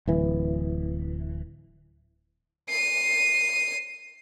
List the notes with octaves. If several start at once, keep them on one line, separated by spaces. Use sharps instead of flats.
D1 E3
C7 D#7